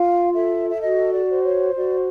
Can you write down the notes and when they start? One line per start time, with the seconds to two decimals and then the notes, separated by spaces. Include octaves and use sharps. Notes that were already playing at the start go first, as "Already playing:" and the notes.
Already playing: F4 F5
0.33 A4 E5
0.70 E5
0.81 F#4 D#5
1.12 D5
1.28 C5
1.43 C#5
1.75 F#4 D5